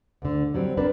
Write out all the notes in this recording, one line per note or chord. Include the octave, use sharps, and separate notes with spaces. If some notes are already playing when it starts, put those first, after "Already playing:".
D2 D3
F#3 G3 C4
C4 D4 A#4 B4 D5